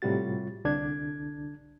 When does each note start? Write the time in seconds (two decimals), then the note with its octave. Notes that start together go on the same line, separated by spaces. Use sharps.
0.02 A2 C3 G3 F4 F#4 A6
0.65 C2 D3 D4 G#6